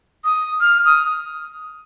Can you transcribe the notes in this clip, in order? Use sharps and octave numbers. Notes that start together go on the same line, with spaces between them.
D#6
F6
D#6